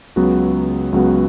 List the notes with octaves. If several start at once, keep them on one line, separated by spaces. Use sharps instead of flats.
C#2 C#3 F#3 B3 F#4
C#2 C#3 F#3 B3 F#4